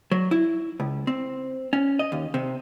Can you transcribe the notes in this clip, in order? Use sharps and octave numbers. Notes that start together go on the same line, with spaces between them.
F#3
E4
C#2
C4
C#4
D#5
D#2
C3